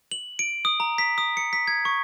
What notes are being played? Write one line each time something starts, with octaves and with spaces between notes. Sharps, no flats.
F#7
D7
D#6
A#5
B6
D#6
C#7
B6
G#6
C#6